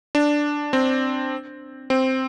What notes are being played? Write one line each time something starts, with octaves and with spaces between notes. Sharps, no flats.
D4
C4
C4